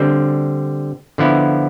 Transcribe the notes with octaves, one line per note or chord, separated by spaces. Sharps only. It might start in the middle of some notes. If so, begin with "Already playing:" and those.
Already playing: D3 G3 C4
D3 F3 B3 E4